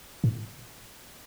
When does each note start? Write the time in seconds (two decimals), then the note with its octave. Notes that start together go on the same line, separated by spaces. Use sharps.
0.24 A2